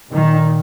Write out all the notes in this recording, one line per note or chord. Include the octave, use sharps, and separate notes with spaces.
A#2 D#3